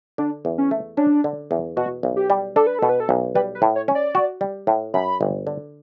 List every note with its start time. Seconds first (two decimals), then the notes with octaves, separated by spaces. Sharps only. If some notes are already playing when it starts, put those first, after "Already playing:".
0.18 D3 D4
0.45 E2
0.58 C#4
0.71 A3
0.97 C#4 D4
1.24 D3
1.51 E2
1.76 B2 F#4
2.03 B1
2.16 G4
2.30 G3
2.56 D4 A4
2.67 B4
2.79 B2 A4
2.89 B4
3.00 A4
3.09 B1
3.35 G3 B4
3.55 B4
3.62 A2
3.76 C#5
3.88 C#4
3.95 D5
4.15 F#4
4.41 G3
4.67 A2
4.94 F#2 B5
5.21 G1
5.47 D3